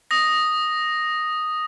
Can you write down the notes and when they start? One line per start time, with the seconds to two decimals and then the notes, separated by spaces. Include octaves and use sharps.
0.11 D#6 A#6